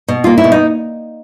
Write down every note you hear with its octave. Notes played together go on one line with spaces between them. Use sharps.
B2
A#3 F4
E4
B2
D#4